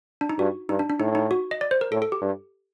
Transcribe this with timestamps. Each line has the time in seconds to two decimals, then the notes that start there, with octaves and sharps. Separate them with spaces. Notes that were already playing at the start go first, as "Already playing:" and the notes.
0.21 D4
0.29 D#4
0.39 G2 F#4
0.69 G2 D#4
0.79 D4
0.90 D4
1.00 A2 D#4
1.15 D#4
1.31 F#4
1.51 D#5
1.61 D5
1.71 C5
1.81 A#4
1.92 A2 A4
2.02 A4
2.12 G4
2.21 G2